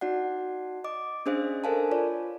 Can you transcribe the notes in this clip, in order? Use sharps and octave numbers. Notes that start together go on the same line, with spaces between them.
D#4 F#4 D5 F#5
D#5 D6
C#4 D4 G#4 C5 D#5 F5
A4 A#4 C5 F5 G#5 A5
F4 C#5 D5